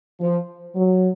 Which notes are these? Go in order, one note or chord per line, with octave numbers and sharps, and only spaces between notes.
F3
F#3